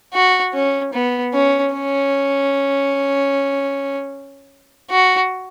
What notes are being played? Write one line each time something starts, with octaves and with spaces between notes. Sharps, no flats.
F#4
C#4
B3
C#4
C#4
F#4